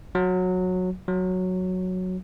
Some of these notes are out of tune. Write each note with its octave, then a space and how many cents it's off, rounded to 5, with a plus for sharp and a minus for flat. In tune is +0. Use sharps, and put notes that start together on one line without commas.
F#3 -15
F#3 -5